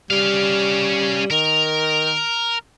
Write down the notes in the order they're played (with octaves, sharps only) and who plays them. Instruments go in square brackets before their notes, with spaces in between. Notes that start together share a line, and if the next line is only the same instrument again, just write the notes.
[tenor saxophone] G3 [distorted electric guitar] C#4 F5
[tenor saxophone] D#3 [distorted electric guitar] A#4